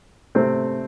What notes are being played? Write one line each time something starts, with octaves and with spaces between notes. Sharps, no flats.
C3 A3 C4